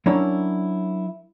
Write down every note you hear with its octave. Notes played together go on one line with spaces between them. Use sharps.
F#3 C#4 D4 E4 A#4 C#5